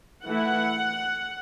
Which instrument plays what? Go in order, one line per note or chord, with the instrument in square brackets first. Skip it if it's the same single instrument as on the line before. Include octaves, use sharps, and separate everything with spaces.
[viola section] E3 A3 E4 F#5